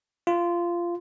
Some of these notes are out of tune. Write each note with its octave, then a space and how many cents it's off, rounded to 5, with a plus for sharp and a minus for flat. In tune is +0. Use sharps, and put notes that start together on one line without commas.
F4 -15